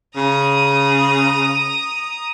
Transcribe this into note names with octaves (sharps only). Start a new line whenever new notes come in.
C#3 A#5 D#6